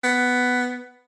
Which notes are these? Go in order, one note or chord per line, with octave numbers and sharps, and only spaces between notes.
B3